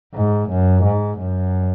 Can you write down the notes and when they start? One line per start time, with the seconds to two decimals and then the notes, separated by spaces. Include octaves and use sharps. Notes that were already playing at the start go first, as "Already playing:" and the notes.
0.14 G#2
0.49 F#2
0.84 G#2
1.18 F#2